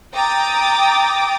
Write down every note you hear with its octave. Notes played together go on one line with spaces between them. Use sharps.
G5 A#5 D6 D#6 A6